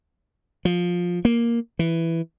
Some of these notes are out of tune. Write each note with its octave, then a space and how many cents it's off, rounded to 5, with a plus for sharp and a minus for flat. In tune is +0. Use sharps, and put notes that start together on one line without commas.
F3 +15
A#3 +5
E3 +5